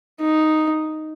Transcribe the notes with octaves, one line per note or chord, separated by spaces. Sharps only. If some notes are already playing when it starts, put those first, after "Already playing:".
D#4